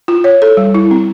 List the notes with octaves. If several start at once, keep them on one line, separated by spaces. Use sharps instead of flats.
F4
C#5
A4
G3
E4
C4